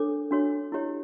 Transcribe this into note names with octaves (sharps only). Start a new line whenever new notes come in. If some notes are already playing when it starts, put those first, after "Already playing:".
Already playing: D4 A4 C#5 D6
D4 F#4 C#5
E4 G4 C#5